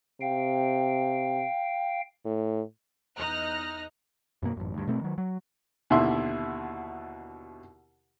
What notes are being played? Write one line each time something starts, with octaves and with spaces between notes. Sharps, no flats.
C3 F5 G5
A2
E2 D#4 F6 F#6 A#6
F#2 B2 A#3
A1 F#2
D2 G2
B2 A3 C4
D#3 F#3
F#3
D#2 B2 D3 E4 E5 C6